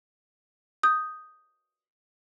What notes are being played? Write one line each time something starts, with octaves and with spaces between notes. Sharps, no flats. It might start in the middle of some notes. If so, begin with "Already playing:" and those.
D#6 G6